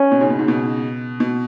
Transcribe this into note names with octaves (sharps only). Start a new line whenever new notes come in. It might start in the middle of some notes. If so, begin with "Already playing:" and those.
Already playing: C#4
B2
G#2 C#3
B2
G#2 C#3
B2
B2